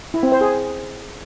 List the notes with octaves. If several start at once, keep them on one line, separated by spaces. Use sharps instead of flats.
E4
C4
C5
G#4